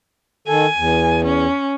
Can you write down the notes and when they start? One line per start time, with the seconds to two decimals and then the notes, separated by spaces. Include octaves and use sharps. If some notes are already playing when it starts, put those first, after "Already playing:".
0.48 D#3 A4 G#5
0.77 E2
1.25 C#4